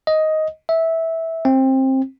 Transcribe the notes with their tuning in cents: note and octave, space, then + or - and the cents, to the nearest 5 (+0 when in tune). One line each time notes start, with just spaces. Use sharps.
D#5 +10
E5 -15
C4 +20